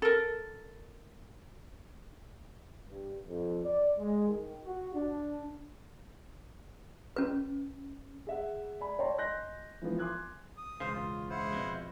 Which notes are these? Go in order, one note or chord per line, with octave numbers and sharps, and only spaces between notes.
A4 A#4
G2
F2
D5
G#3
D#3
F#4
D4
C#4 B4
G#4 E5 F#5
D5 G#5 B5
C#5 D5 G5 A5 A#5 C6
D#5 G#5 C6 F#6 G6 A#6
E3 F3 B3 F4
G#5 C6 D6 D#6 F#6 G#6
D#6
E1 C#2 C#3 C5 F5
F4
G#3 E4 C5 F5 F#5
F2 B2